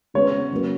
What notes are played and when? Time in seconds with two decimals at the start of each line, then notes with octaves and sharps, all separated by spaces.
0.14 C#3 G#3 B3 C#5
0.51 C#3 F#3 A#3